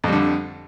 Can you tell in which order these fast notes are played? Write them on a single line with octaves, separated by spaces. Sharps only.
F2 G3 D3